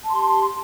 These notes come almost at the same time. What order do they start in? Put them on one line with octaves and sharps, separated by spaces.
A5 C6 G4